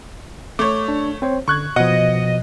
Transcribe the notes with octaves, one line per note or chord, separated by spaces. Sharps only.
A3 C#5 D6
D4
C4 C5 C#5
D3 C#6 F#6 G#6
B2 F3 D#5 F#5